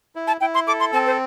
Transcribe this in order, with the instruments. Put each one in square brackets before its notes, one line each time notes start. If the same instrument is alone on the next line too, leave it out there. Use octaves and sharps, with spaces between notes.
[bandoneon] E4
[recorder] A5
[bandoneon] E4 [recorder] G5
[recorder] C6
[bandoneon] A4 [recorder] D6
[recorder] C6
[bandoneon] C4 [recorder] A5
[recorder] C5